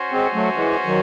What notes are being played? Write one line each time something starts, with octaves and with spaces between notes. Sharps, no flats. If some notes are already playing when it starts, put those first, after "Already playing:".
Already playing: C#4 F#4 C5
G#3 C4
F#3 A3
E3 G#3
D#3 F#3